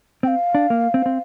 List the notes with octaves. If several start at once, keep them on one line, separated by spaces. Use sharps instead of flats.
C4 F5 G5
D4
A#3
C4
C4